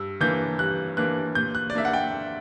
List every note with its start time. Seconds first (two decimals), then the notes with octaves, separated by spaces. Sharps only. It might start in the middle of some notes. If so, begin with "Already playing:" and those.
Already playing: G2 E6
0.20 E3 A#3 D4 G6
0.59 G2 F#6
0.97 E3 A#3 D4 F#6
1.35 A#2 G6
1.55 F#6
1.70 D5
1.75 A#3 D4 E5
1.85 F#5
1.93 G5